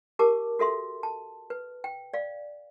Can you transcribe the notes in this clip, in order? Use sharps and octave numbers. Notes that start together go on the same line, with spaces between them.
G4 A#4 A5 D6
F#4 A4 E5 C6
A5
B4
G5
D5 F5